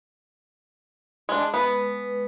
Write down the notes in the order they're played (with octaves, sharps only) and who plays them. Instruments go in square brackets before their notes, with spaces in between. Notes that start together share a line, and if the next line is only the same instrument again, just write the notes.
[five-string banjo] G#3 D4
[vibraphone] G#3 B4 [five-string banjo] B3